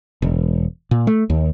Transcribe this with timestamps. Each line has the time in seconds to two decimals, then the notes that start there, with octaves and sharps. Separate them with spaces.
0.22 E1
0.91 A#2
1.07 A3
1.30 D#2